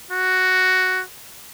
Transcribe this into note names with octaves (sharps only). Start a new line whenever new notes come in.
F#4